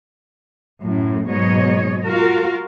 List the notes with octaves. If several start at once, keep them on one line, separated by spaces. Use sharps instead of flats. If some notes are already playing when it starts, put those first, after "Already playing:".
F#2 A2
G#2 B2 F#3 C#5 D#5
F4 F#4 A#4